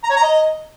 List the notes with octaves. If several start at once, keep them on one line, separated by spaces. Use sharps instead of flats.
A#5
C#5
A#5
D#5